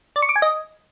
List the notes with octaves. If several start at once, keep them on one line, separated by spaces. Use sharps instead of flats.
D5
C#6
D6
G#5
D#5